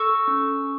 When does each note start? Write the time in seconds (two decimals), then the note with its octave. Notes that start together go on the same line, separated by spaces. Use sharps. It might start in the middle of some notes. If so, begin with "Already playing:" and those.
Already playing: A4 C#6 E6
0.27 C#4